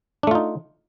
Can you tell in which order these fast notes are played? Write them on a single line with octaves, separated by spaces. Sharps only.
D4 A3 F4 D#4